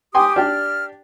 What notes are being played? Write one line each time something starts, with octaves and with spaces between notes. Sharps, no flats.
G4 G5 G#5 C6 D6 D#6
D4 G4 D5 F6